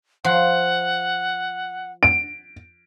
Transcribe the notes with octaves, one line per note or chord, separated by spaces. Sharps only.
F3 F#5
D7